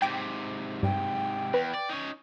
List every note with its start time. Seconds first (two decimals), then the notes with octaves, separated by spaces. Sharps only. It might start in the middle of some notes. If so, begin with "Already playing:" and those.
0.02 G#2 C3 G5 D6
0.83 G2 G5
1.54 E2 B4
1.74 D5
1.89 C#4 D#4